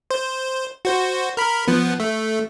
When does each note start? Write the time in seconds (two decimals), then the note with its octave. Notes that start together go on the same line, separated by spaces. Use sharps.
0.11 C5
0.85 F#4 C5
1.37 A#4 B5
1.68 F3 B3
2.00 A3